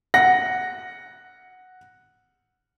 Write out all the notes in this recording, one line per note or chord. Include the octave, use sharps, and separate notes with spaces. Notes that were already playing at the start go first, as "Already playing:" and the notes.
F#5 A#6